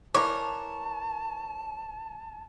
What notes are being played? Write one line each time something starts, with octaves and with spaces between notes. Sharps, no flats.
E3 A#4 C#5 A5 D6